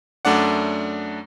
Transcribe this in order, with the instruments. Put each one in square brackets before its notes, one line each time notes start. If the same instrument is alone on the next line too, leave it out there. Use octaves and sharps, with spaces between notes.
[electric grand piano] F#2 A3 D4 D5 F#5